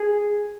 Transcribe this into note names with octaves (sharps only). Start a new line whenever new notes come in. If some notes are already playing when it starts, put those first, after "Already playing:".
Already playing: G#4